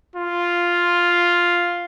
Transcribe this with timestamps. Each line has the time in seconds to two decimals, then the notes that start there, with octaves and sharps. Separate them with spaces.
0.16 F4